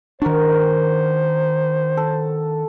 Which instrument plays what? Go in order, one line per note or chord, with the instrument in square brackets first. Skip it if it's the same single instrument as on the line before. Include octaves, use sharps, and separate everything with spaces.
[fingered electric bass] D#3 D4 [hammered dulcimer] F#4 A#4 [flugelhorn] C5
[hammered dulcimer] A4